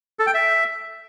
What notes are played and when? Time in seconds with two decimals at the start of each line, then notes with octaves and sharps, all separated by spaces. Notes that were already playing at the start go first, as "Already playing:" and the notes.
0.19 A4
0.27 G5
0.34 E5